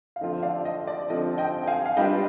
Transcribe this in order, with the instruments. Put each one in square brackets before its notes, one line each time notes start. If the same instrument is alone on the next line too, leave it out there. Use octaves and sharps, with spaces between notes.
[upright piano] F5
[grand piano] F2 D3 F3 C4 F4 [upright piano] D#5
[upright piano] D5 F5
D#5
D5
[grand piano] F2 D3 F3 C4 F4 [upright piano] D#5
[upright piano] D#5 G5
G5
F5 G#5
F5
[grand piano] G3 D4 F4 B4 [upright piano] D#5 G5